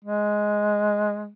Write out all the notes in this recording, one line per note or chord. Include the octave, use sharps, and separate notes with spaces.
G#3